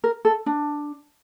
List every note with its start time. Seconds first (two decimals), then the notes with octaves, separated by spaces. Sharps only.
0.04 A#4
0.25 A4
0.46 D4